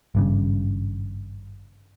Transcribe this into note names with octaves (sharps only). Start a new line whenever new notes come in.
G#1 G2 C#3